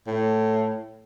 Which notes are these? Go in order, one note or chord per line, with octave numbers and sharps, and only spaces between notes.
A2